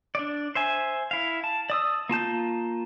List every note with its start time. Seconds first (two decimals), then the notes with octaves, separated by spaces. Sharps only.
0.15 D4 D5
0.55 C5 E5 G#5
1.11 E4 F5
1.44 A5
1.70 D5 D#6 E6
2.09 A#3 F4 A5 G6